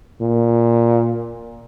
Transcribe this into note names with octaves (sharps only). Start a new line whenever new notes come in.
A#2